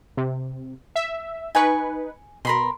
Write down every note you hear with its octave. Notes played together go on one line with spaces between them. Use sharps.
C3
E5
D#4 B4 G#5 C#6
B2 A#4 B5 C6